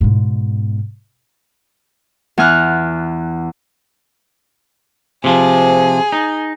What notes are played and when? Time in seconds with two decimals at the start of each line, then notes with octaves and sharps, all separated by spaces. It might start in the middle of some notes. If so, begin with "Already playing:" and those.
0.01 G#2 B2
2.38 E2 B3 G#5 F6 F#6
5.24 C3 F3 G#4
6.12 D#4